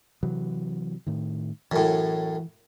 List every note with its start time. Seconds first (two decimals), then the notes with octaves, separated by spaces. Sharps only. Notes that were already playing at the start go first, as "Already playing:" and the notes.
0.23 C3 E3 F#3
1.07 A2 D#3
1.72 F#2 A2 E3